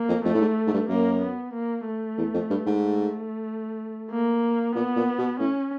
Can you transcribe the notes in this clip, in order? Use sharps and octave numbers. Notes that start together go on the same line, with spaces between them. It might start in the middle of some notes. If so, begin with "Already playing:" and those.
Already playing: A#3
F2
F2 A3
A2
G#2
G#2
G2
F#2 A#3
B3
A#3
A3
E2
F2
G2
G#2
A3
A#3
A#2 B3
A#2
B2
A2 C#4